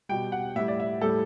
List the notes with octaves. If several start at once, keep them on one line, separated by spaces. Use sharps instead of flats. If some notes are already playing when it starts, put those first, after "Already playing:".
B2 G3 G5
F#5
A2 G3 E5
D5
E5
A2 G3 A4